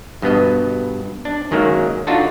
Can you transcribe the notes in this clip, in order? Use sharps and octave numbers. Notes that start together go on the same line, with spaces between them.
G2 B2 B3 D#5
D4
F#2 D#3 F#3 G#3 A#3
D4 D#4 F4 F#4 A4